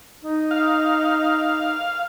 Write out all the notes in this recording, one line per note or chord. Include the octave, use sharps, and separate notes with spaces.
D#4
F5